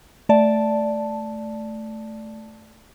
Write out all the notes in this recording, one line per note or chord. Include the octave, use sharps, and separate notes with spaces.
A3 D5 A5